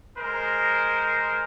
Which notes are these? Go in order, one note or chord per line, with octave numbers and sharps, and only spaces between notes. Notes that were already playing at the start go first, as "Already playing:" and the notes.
G#3 A#4 C5